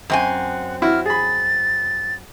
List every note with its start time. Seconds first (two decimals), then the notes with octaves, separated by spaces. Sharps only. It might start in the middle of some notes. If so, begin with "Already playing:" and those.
0.10 F#2 C4 F#5 G#5
0.82 E4 F#4 F6
1.06 G#4 B5 A6